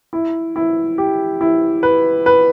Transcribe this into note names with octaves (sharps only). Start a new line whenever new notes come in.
E4
E4
G4
E4
B4
B4